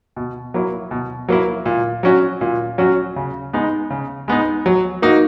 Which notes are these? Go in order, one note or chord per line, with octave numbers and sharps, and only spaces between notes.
B2
F#3 A#3 E4
B2
F#3 A#3 E4
A#2
F#3 C#4 F#4
A#2
F#3 C#4 F#4
C#3
G#3 B3 D#4
C#3
G#3 B3 D#4
F#3
A#3 D#4 F#4